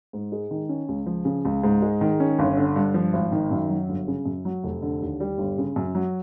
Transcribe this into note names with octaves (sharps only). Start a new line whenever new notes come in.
G#2
G#3
D#3
C#4
C#2
F3
C#3
C#2
G#2
G#3
D#3
C#4
G1
D3
G2
F3
G#1
D#3
F#2
F#3
G1
C#3
F#2
F#3
F1
D3
D#2
G3
G1
C#3
F#2
F#3